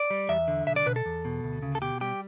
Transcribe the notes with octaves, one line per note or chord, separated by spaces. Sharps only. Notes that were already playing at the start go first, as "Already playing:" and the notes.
Already playing: D5
G3
E2 E5
D3
B1 E5
D5
B2 B4
A4
E2
B2
D2
C#3
A4
B2 G4
G3 G4